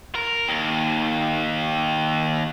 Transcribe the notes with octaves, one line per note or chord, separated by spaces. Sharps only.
A#4
D#2